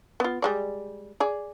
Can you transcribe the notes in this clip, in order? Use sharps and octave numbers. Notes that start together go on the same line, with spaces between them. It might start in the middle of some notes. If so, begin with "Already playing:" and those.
B3 F4
G3 G#3 D5
G#4 D5